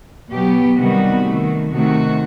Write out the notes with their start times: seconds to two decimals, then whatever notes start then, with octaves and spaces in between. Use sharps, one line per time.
0.31 B2 F#3 B3 G4
0.77 C3 D#3 G3 B3 F#4
1.24 D#3 A3
1.70 C3 D#3 A3 F#4